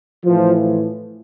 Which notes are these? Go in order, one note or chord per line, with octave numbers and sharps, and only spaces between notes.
A2 E3 F3